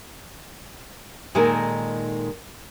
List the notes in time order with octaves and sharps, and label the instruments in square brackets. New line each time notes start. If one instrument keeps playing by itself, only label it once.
[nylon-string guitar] A#2 D#3 G#3 D#4 A4 A#4